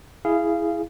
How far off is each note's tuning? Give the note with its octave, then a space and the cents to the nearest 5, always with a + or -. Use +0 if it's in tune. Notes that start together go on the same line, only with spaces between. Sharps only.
E4 +0 G#4 +0 F5 -20